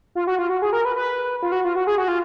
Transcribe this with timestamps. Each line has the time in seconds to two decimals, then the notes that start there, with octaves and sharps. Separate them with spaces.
0.15 F4
0.27 F#4
0.39 F4
0.50 F#4
0.62 G#4
0.73 A#4
0.85 B4
0.96 B4
1.43 F4
1.52 F#4
1.65 F4
1.76 F#4
1.87 G#4
1.98 F#4
2.08 F4